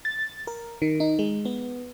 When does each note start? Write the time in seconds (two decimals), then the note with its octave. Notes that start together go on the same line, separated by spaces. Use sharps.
0.05 A6
0.47 A#4
0.82 D#3
1.00 D#4
1.19 G#3
1.45 B3